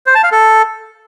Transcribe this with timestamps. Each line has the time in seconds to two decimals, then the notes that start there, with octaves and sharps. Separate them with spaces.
0.06 C5
0.15 A5
0.23 F5
0.32 A4